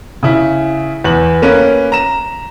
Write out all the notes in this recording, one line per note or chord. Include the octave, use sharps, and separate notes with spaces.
C#3 E4
E2 F#7
A#3 C#4 A#4 B4
A#5 E7